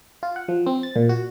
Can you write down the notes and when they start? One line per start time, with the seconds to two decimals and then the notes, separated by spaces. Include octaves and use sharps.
0.23 F4
0.36 F#5
0.48 F3
0.66 C4
0.83 A6
0.96 A#2
1.09 F#4